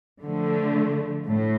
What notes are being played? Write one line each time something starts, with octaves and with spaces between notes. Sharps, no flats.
D3 F3 A3
A2